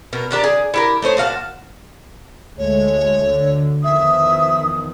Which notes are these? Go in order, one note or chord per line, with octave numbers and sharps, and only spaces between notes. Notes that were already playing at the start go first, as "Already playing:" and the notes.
B2 A#4
D#3 D4 G4 A#5
G#4
E4 G4 A#4
A3 D#4 C5 C#5
A#2 F#4 F5 A5
D2 G#3 A3 C#5
D2 D3
E2 D#3 F3 E5 D#6